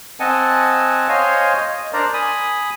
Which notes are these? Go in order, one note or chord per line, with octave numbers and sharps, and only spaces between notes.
C4 D#5 F#5 G#5 A5
C5 C#5 D#5 F5 G#5
D#5
D4 A#4 C5 D5 A#5
G#5 B5 D#6